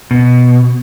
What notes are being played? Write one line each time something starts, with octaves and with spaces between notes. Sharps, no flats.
B2